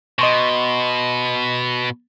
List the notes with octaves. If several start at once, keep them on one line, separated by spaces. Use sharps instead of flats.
B2 D#5 C6 C#6